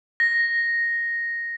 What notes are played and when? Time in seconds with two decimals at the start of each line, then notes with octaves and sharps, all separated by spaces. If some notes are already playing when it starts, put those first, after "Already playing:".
0.20 A#6